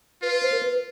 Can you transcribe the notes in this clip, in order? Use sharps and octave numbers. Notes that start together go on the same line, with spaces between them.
F4 B4
B4
C5
A#4
B4